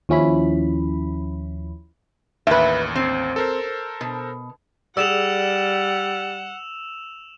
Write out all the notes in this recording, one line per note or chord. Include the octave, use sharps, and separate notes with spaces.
D#2 F3 C#4 E4 B5
A1 D#2 B4 E5
C4
A4 A#4 C5
B2
G3 G#4 D5 F#5 E6 E7 F7